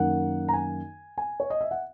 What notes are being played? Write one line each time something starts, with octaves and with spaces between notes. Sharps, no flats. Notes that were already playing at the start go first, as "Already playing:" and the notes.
Already playing: F#2 D#3 A#3 F#5
A#5
G#5
G#5
C#5
D#5
E5
F#5